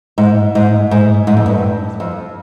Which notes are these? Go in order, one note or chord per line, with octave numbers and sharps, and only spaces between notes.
G#2
G#2
G#2
G#2
F2
G2
F2